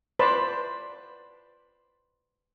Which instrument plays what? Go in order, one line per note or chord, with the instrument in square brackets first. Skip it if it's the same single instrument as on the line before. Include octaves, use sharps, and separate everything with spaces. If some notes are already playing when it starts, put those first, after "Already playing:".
[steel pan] B4 C5 D5 A5 B5